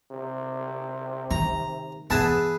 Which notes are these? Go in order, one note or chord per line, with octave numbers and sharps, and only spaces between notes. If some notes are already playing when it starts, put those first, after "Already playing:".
C3
D#3 A#5
E2 B3 G#4 B4 E5 A5